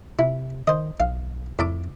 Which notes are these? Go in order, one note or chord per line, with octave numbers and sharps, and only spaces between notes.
C3 E4
D#3 C5 D#5
B1 F5
F2 A2 A4 D6